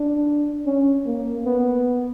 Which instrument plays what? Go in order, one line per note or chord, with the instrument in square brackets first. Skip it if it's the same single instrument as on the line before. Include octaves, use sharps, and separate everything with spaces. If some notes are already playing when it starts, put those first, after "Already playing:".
Already playing: [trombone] D4
C#4
A#3
B3